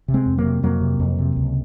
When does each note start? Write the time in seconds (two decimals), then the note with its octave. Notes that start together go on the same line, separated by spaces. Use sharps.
0.08 C3
0.14 G#3 C4
0.26 F2
0.38 F#3 A#3
0.44 C3
0.63 F2 F#3 A#3
0.81 C3
1.00 F2
1.19 C3
1.36 C#2